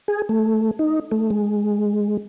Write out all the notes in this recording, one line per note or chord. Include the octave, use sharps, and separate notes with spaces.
G#4
A3
D#4
A3
G#3